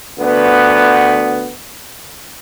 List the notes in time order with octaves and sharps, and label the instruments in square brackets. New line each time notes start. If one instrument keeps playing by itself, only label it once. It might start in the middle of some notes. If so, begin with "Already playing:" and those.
[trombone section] D2 B3